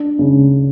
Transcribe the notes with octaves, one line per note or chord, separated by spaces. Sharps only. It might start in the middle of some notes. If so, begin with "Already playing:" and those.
Already playing: D4
C#3